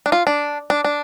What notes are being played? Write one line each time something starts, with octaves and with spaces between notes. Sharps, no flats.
D4
F4
D4
D4
D4